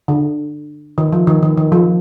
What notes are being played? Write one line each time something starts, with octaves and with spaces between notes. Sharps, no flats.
D3
D#3
F3
D#3
D#3
D#3
F3